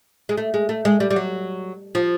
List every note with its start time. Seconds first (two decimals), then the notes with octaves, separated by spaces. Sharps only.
0.29 G#3
0.37 A3
0.54 G#3
0.69 A3
0.85 G#3
1.00 G3
1.10 G3
1.16 F#3
1.95 F3